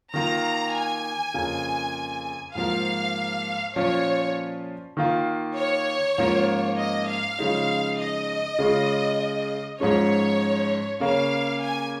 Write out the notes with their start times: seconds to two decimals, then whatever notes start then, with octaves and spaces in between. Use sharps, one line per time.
0.14 D#3 A#3 F4 A#5
0.74 G#5
1.34 F2 C#3 A#3
2.55 G#2 F3 A#3 F5
3.76 A#2 F3 C#4 F4 C#5
4.97 D#3 A#3 F4
5.57 C#5
6.18 G#2 F3 A#3 C#4 F4
6.78 D#5
7.08 F5
7.39 C#3 F3 G#3 D#4
7.99 D#5
8.59 C#3 G#3 C#4 F4
9.80 G#2 F3 G#3 C#4 C#5
11.00 C#3 A#3 C#4 F5
11.61 G#5